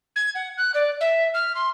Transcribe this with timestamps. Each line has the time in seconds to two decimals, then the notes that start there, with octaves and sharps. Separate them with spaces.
0.15 G#6
0.35 F#5
0.57 F#6
0.74 D5
1.00 E5
1.34 F6
1.54 C6